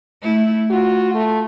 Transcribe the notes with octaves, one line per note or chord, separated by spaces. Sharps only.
A3 E4
F4 F#4
A3